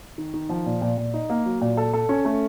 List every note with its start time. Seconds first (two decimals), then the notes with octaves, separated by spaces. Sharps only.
0.18 D#3
0.34 D#3
0.49 F3
0.66 A#2
0.81 A#2
0.97 A#2
1.14 D#4
1.30 A#3
1.46 F#3
1.61 A#2
1.77 A4
1.94 A4
2.09 C#4
2.25 A3